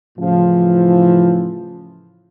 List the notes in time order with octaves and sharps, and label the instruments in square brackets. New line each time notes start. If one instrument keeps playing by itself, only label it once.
[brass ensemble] A2 C#3 E3 F3